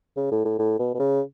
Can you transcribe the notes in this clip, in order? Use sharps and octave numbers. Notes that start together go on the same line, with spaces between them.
C#3
A2
A2
A2
B2
B2
C#3